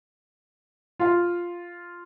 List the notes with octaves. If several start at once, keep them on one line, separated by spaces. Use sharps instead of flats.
F4 F5